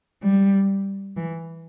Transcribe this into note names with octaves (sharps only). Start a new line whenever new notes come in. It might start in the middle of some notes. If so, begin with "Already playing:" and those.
G3
E3